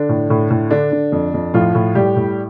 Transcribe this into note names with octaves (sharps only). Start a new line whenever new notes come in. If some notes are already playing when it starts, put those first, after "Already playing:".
Already playing: D3 D4
A2
A2
A2
D3 D4
D3
F2
F2
A2 F3 F4
A2
A2 G3 G4
A2